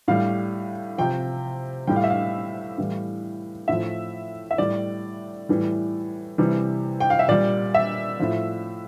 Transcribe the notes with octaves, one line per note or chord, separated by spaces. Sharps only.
A2 G3 F5
C3 F3 G5
A2 G3 G5
F5
E5
F5
A2 E3 G3
A2 F3 E5
E5
A2 G3 D5
A2 E3 G3
C3 E3 G3
G5
F5
E5
A#2 G3 D5
E5
A2 F3